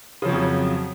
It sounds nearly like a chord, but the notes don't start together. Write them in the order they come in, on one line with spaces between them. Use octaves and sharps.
C#3 F3 F#3 F2